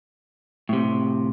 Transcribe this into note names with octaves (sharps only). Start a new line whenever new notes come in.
A2 C3